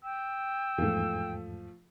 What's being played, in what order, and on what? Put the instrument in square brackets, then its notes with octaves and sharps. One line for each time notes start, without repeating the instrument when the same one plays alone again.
[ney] G5 [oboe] E6
[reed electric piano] E2 G#2 [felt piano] F3 A3